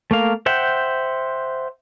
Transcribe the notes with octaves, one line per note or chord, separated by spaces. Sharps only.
A3 A#3 F5
C5 E5 F#5 G5